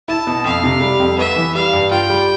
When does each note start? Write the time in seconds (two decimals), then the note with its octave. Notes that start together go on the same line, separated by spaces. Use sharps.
0.08 E4 A5
0.27 B2
0.45 F2 F5
0.63 C3
0.81 G3
1.00 F2
1.18 B3 E5
1.36 E3
1.54 G3 F5
1.73 G2
1.91 F4 G5
2.10 G3